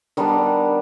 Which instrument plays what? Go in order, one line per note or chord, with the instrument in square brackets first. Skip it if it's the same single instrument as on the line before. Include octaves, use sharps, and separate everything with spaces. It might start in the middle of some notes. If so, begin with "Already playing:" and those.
[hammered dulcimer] D#3 G3 B3 D4